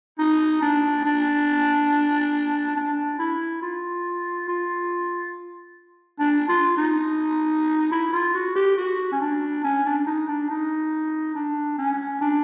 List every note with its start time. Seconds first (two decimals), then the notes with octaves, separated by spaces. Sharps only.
0.19 D#4
0.62 D4
1.05 D4
2.77 D4
3.19 E4
3.62 F4
4.48 F4
6.20 D4
6.49 F4
6.77 D#4
7.92 E4
8.13 F4
8.34 F#4
8.56 G4
8.77 F#4
9.12 C#4
9.21 D4
9.64 C#4
9.86 D4
10.07 D#4
10.28 D4
10.50 D#4
11.35 D4
11.78 C#4
12.21 D4